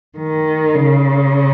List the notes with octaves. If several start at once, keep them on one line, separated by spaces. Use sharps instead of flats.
D#3
C#3